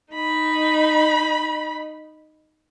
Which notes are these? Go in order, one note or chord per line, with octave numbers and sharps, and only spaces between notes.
D#4 B5